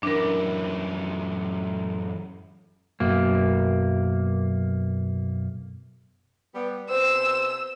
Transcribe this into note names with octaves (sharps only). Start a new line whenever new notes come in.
F#2 E3 D4 A#4
B1 F#2 A#3
G3 B3
C3 B3 C5 E6